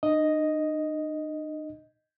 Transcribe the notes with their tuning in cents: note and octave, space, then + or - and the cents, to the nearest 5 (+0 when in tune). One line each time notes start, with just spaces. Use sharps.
D#4 -45 D#5 +0